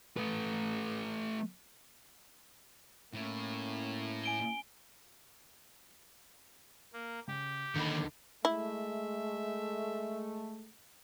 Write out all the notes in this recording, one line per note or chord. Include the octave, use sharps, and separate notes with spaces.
A3 B4
A2 A#3 C#4
G#5 D7 G7
A#3
C#3 G4
D#2 D3 D#4 B5 D6
G#3 A3 E4 E5